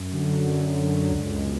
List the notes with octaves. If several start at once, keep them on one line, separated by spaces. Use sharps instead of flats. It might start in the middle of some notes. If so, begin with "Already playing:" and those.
Already playing: F#2
D3 F#3
F#2
D3 F#3
C#2
B2